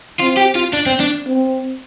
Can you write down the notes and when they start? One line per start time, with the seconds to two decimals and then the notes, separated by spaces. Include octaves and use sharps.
0.20 C4 F4
0.37 G4
0.56 F4
0.74 D4
0.86 C4
1.00 D4
1.27 C4